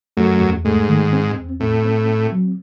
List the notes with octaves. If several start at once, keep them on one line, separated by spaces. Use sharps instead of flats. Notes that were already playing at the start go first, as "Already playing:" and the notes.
F#2 A3
E2
G#2 A3
D#3
C4
E2
A2 C4
C4
C4
F#3